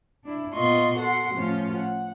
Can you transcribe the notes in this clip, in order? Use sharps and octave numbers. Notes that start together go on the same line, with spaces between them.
D4 E4
A#2 B3 F4 D#5 C6 C#6
F#4 A4 F#5 C6
A2 F3 C#4 F4
F#5